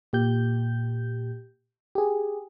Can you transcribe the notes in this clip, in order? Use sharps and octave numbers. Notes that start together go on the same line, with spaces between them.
A#2 G4 G6
G4 G#4